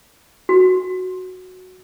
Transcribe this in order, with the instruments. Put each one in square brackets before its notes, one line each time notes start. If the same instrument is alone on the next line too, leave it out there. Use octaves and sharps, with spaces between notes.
[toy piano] F#4